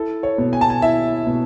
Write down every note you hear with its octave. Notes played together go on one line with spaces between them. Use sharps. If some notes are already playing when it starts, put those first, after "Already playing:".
Already playing: E4 A4
C#5
B2
G#5
A5
G#5
E4 E5
B2